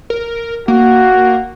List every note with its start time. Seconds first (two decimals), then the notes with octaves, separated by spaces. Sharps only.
0.10 A#4
0.68 A#3 F#4